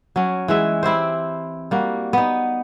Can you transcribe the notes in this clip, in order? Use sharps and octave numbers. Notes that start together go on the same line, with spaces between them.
F#3 C#4
E3 G#3 E5
C4 E4 G4 C5
G3 A#3 F#4
B3 D#4